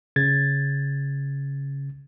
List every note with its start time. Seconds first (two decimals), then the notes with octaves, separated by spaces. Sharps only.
0.16 C#3 G#6 A6